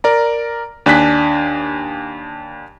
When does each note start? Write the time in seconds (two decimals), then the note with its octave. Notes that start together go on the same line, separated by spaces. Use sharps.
0.04 A#4 D5 A#5
0.86 D#2 D4 G#5 F#6 B6